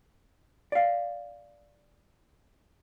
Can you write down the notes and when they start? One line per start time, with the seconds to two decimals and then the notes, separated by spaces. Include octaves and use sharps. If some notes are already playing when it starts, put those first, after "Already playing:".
0.72 D5 F5